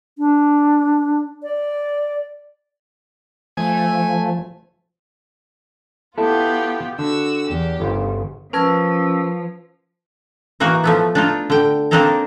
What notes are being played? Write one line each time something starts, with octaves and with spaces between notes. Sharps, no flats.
D4
D5
F3 A3 G#5
B3 E4 F4 G4 A4
D3 F#4 E6
E2 G4
G1 C#3 C5
F3 C#4 A#4 B4 A5 E6 G#6
E3 A#3 D#4 F#4
F3 A3 B3
D4 D#4 F4
D3 G5
A#3 C4 D4 D#4 A4 A#4